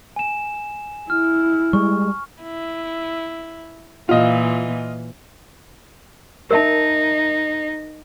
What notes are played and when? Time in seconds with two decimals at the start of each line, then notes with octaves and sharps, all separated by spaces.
0.16 G#5 E7
1.10 E4 F6
1.73 G3 G#3 C#6
2.42 E4
4.09 A#2 E3 F4 D#5
6.51 D#4 A#4 E5 A5